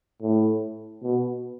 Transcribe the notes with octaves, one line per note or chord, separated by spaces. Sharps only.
A2
B2